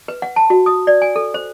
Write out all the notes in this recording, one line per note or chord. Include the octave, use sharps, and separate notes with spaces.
B4
F#5
A5
F#4
D#6
D5
G#5
A4
C5